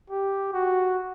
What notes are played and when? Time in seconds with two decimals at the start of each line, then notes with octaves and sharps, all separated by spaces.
0.10 G4
0.53 F#4